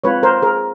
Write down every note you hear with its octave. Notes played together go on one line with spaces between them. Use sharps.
G#3 C4 F4 B4 C#5
A#4 C5
G#4 A#4